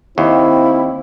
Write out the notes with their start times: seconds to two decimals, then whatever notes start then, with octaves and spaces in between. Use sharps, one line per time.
0.18 D#2 C4 E4